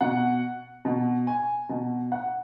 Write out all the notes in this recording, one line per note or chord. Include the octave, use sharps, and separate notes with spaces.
B2 F#5
B2
G#5
B2
F#5